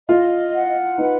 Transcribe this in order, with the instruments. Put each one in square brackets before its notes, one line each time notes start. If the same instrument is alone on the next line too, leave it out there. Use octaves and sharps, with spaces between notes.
[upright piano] F4 [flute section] D#5
[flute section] F#5
[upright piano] D#4 [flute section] B4